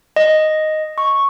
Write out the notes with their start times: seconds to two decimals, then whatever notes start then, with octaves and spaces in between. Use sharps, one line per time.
0.16 D#5
0.98 C#6